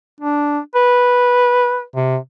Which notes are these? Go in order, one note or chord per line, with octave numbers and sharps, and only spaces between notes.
D4
B4
C3